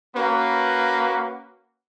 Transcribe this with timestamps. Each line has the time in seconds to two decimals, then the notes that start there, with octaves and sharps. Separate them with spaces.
0.15 A#3 C#4 F#4 B4